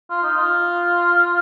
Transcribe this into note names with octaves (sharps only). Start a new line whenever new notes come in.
F4
D#4
F4